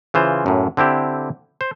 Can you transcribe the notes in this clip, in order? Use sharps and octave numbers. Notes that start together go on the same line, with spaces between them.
C#3 E3 F4 C5
F#2 A2
D3 C4 E4 G4
C5